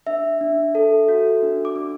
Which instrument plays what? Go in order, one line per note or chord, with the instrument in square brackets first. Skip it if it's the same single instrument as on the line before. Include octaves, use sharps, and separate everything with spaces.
[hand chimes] D4 E5
D4
A4
F#4
D4
D6
D4